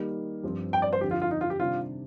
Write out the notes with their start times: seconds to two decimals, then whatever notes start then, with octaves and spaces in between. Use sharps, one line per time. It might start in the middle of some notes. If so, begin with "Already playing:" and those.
Already playing: D#3 G3 A#3 D#4
0.43 G2 F3 C4
0.73 G5
0.82 D5
0.93 C5
1.01 F2 D3 F3 G4
1.11 F4
1.22 F4
1.31 D#4
1.41 F4
1.50 G4
1.60 C3 D#3 G3 D4 F4